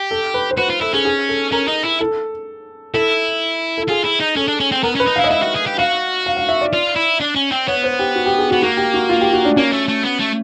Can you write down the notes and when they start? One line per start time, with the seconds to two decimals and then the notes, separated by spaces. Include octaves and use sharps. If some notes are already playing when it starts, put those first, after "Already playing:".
Already playing: G4
0.11 A4
0.34 B4
0.51 C5
0.57 F#4 B4
0.70 F4
0.81 E4 A4
0.94 C#4 G#4
1.05 G#4
1.29 A4
1.52 C#4 A#4
1.68 D#4
1.84 E4
2.01 A4
2.94 E4 A4
3.77 A4
3.89 F4 G#4
4.05 E4
4.20 D#4
4.36 C#4 A4
4.48 D4
4.60 C#4
4.72 C4
4.83 B3 A#4
4.95 C#4 B4
5.07 D#4
5.16 F5
5.19 E4
5.24 D#5
5.31 E4 E5
5.42 F#4
5.55 G#4
5.66 G4
5.78 F#4 F5
6.26 F5
6.37 F5
6.49 E5
6.61 D5
6.73 F4 D5
6.96 E4
7.21 D4
7.36 C#4
7.52 C4
7.67 B3 C#5
7.84 C5
7.99 G4
8.15 F#4
8.26 G4
8.38 G#4
8.51 B3 F#4
8.62 A#3 F#4
8.77 G4
8.94 F#4
9.09 F4
9.21 G4
9.33 F#4
9.45 D4
9.56 A#3 C#4
9.73 A3
9.89 A3
10.04 B3
10.20 A3